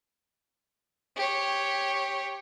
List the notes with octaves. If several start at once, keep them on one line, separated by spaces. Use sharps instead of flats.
G4 C#5